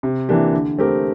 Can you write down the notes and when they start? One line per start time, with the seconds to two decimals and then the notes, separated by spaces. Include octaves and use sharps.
0.03 C3
0.29 E3 A#3 D4 G4
0.53 D3
0.78 A3 C4 G4 A#4